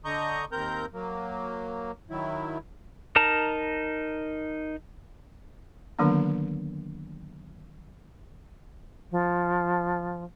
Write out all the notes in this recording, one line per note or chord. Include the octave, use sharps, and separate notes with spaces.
D3 D#5 A#5 C#6 G6
D#2 C4 A#4 A#5 G6
F#3 A#3
D#3 F#3 E4
D#4 A#4 A5 A#5
D3 D#3 F#3 A#3 B3 D4
F3